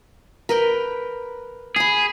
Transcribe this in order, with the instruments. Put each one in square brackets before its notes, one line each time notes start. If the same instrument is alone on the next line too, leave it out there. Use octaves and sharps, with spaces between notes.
[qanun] A#4 B4 G5
[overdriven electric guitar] G#4 [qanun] G#5 B5